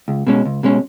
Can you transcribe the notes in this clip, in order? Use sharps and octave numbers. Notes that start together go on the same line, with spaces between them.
C#2
B2 G#3 C#4
C#2
B2 G#3 C#4